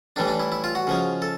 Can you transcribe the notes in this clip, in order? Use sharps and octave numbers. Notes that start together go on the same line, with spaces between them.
A2 E3 G3 D4
D4
E4
E4
F4
F#4
C#3 F3 G#3
A4